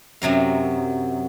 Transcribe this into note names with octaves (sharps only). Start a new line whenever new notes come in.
F#2 C3 F#3 F5